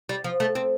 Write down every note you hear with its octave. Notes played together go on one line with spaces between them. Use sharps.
G3
F3
A3
C4